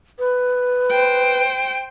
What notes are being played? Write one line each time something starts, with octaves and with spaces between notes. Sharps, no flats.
B4
C5 G5